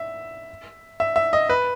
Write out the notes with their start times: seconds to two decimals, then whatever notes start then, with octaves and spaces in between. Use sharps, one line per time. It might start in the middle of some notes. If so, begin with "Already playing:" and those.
Already playing: E5
1.00 E5
1.16 E5
1.33 D#5
1.50 B4